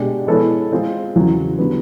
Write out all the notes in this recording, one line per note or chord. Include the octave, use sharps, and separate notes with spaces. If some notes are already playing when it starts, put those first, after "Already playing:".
Already playing: B2 G#3 B3 D4 G4
G#3 B3 E4 A4 C#5
G#3 C4 F4 G#4 C5
E2 C#3 F#3
D3 G3 B3